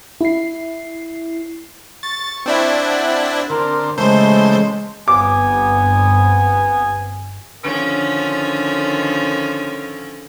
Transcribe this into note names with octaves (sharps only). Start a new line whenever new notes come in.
E4 C7
C#6 A6
C4 D4 E4
F#5
D3 C4 A#4
C#3 E3 G#3 A3 C5
G1 G2 B3 C4 G#5 D6
D3 D#3 F3 C#4